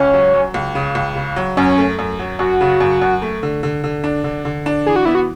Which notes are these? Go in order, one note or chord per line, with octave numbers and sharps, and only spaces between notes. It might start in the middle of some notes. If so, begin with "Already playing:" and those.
Already playing: C#2 C#4
F#3
F#3
C#2
C#3
C#2
C#3
F#3
F#2 C#4
A3
F#2
F#3
F#2 F#4
C#3
F#2
F#2
A3
D3
D3
D3
D4
D3
D3
D4
E3 G#4
F#4
B3 E4
F#4